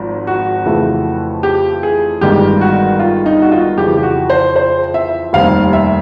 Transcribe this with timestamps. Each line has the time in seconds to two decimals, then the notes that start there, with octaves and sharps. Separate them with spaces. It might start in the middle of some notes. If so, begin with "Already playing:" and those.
Already playing: G#1 G#2 F3
0.27 F#4
0.65 F2 C#3 E3 A3
1.43 G4
1.83 G#4
2.21 G1 G2 D#3 G#3 G4
2.61 F#4
2.99 F4
3.26 D#4
3.42 F#4
3.52 F4
3.77 F2 C#3 E3 G4
3.97 G4
4.03 F#4
4.30 C5
4.56 C5
4.94 E5
5.33 F1 D#2 D#3 G3 C4 F5
5.73 E5